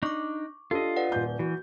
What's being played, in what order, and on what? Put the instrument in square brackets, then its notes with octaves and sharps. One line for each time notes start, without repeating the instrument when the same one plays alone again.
[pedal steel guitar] D4 D#4 [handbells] C#6 D6
[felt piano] D4 G4 A4 [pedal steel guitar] F4 D#5
[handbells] B4 D5 F#5
[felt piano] D#1 G6
[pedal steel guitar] E3 [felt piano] F#4